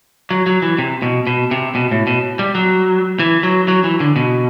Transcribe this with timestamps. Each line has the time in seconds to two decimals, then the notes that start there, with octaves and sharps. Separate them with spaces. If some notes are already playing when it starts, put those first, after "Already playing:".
0.30 F#3
0.46 F#3
0.62 E3
0.78 C3
1.02 B2
1.27 B2
1.51 C3
1.75 B2
1.91 A2
2.07 B2
2.39 G3
2.55 F#3
3.19 E3
3.43 F#3
3.68 F#3
3.84 E3
4.00 D3
4.16 B2